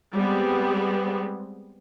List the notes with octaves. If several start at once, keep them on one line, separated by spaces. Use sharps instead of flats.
G3 G#3 B3 C4